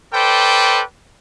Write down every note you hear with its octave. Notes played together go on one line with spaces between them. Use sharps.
A4 B4 C5 D5 G5